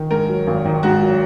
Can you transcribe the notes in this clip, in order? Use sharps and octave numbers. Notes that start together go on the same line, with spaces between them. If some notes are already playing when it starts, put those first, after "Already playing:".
Already playing: D#3
G#2 A#4
F#3
G#1
D#3
G#2 F#4
F#3